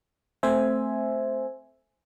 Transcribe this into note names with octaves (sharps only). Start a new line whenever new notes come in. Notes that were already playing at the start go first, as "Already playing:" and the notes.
A3 C4 C5 E5 G#5